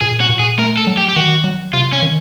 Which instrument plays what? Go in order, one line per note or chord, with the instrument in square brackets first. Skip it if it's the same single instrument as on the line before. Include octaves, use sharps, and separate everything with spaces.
[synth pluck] A#2 [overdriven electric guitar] G#4
[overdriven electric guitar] F#4
[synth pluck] A#2
[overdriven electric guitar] G#4
[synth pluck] A3 [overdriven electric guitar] A#4
[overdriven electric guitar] A4
[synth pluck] F#3
[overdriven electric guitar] G4
G4
[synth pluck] D#3 [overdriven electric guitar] F#4
[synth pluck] F#3
[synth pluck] C3 [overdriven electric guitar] F4
[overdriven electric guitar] C#4
[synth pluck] D#3